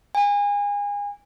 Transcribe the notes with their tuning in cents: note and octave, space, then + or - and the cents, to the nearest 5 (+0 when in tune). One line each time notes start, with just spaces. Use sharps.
G#5 -30